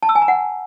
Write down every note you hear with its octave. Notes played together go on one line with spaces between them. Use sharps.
A5
E6
G#5
A#5
F#5